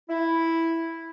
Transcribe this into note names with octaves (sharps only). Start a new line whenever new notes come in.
E4